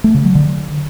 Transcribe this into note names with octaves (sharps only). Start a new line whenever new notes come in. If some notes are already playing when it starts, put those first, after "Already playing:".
A3
C#3
F#3
D3